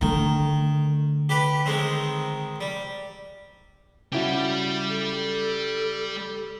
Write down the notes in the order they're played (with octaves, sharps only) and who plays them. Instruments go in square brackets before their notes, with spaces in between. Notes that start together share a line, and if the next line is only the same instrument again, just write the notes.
[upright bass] D3 A3 [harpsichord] D#3
[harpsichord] G4 B4
D#3 G#3 C4
G3
[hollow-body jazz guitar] C#3 E4 F#4 [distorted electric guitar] G3 G4
[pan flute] A4